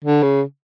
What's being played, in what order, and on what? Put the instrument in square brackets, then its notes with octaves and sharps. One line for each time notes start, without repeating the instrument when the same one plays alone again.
[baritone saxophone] D3
C#3